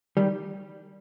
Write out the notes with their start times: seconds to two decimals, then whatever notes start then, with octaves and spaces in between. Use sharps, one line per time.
0.17 D#3 G3